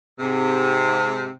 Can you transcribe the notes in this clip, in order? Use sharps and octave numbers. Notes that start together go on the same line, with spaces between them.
G#2 C3